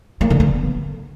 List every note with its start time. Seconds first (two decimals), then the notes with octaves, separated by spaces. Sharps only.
0.21 A#3
0.30 D3
0.40 B3